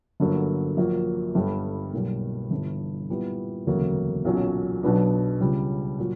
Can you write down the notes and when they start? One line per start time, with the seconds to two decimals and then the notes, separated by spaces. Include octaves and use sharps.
0.20 G1 G2 D3 F#3 A#3
0.77 A#1 A#2 F#3 A#3
1.35 G1 G2 D3 G3
1.93 B1 B2 G3 A#3
2.51 G1 G2 E3
3.09 A#2 G3 B3 E4
3.67 E1 D2 C#3 F#3 A#3
4.25 B1 A#2 F#3 C#4
4.83 B1 B2 F#3 B3 D4
5.41 C#2 C#3 G3
5.99 A#2 F#3